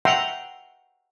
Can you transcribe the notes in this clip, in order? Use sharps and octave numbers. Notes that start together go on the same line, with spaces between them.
E5 F#5 G5 A#5 C6